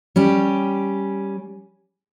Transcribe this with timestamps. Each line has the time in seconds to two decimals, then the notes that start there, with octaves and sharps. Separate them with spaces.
0.16 G3 C#4 G4